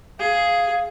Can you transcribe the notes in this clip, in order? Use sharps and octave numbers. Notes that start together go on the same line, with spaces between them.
G#4 F5